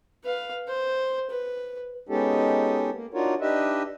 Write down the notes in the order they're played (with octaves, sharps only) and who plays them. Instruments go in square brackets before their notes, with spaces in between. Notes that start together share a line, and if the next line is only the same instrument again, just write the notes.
[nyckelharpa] B4 F5
C5
B4
[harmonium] G#3 B3 C#4 D#4 G4 A4
A#3
D4 D#4 F4 F#4 A#4 C#5
D4 D#4 G4 B4 D#5 E5